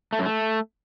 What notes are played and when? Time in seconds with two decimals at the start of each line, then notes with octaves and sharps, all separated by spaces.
0.13 A3
0.19 F#2
0.26 A3